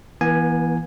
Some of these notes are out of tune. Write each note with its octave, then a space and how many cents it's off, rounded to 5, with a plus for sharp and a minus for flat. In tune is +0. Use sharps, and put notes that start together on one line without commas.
E3 +0 B3 -40 G#5 +0